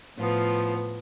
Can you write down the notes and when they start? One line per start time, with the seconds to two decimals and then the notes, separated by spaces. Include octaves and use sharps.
0.17 A2 F3 B3 F4